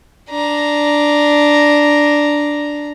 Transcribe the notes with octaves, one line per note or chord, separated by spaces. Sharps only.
D4 A#5